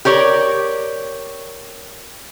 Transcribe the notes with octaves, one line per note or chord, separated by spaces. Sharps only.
G4 A#4 C#5 D5